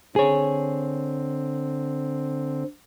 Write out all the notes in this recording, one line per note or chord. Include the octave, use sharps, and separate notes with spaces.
D3 C4 G#4 C#5